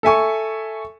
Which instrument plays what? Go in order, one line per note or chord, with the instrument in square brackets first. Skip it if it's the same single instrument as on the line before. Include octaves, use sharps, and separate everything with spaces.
[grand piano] A4 E5 G#5 C#6